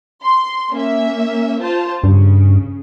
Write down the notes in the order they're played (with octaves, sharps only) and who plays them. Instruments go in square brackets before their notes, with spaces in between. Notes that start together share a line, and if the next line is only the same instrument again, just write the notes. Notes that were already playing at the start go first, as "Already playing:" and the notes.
[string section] C6
A#3 C#4 E5
F4 C5 A5
[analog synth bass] G2 [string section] C#3